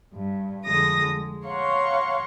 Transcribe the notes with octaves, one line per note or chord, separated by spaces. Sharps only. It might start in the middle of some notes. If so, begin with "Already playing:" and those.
G2
F2 D3 G#3 D#6 A#6
G#3
C#5 F5 F#5 A#5 C6 C#6